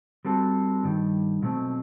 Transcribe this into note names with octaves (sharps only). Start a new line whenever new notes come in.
G3 C4 F#4 A4
G2 D#3 G3
B2 F#3 A3 C4